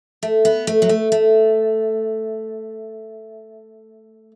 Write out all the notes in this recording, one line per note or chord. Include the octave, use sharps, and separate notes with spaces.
A3
B3
A3
F#3
A3
A3